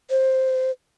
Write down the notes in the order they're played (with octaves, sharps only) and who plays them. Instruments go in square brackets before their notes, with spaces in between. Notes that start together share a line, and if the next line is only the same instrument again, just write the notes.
[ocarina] C5